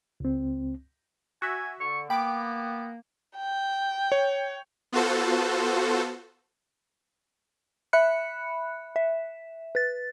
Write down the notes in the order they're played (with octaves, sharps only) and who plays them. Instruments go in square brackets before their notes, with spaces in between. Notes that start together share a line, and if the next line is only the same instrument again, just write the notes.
[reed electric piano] C#2 C4
[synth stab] F#4 E5 [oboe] G#5
[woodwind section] D3 [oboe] C#6
[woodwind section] A#3 [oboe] B3 [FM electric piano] G5 [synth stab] B5 D6
[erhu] G5
[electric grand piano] C#5
[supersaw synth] B3 F4 F#4 A4 C5
[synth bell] E5 B5 F#6 C#7
E5
B4 A6